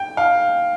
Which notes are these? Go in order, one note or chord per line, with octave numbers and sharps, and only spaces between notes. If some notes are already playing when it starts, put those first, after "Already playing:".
Already playing: G5
F5